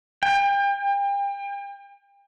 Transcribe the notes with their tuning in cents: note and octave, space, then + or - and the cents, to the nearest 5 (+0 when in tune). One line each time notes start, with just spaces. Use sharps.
G5 +35